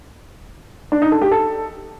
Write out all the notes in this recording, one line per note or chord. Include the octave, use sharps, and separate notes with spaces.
D4
D#4
A4
G4
A4